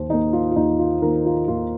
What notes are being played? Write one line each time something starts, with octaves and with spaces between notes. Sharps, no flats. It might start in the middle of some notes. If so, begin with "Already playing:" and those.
Already playing: D#2 C5
D#3 A#3 D#4
F4
F4
D#2 D#4
F4
D#3 A#3 A#4
F4
D#2 F4